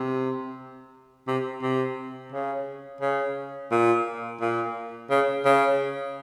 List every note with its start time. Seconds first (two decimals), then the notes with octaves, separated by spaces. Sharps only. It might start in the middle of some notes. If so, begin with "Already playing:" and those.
Already playing: C3
1.27 C3
1.62 C3
2.32 C#3
3.01 C#3
3.71 A#2
4.41 A#2
5.10 C#3
5.45 C#3